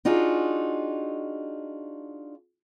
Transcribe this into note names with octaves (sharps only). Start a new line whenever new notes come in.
D4 D#4 F4 F#4 G#4